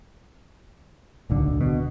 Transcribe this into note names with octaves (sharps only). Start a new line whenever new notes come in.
D1 B1 D3
B2